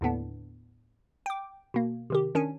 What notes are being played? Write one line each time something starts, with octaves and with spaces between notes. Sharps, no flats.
D#2 A2 D3 B3 D4
G5 D6
B2 A#3
C3 D#3 G4
D#3 C#4 D4 G#5